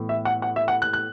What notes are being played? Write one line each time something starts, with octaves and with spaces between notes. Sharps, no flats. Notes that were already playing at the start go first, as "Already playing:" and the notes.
Already playing: A2 E3 B3
E5
F#5
F#5
E5
F#5
F#6
F#6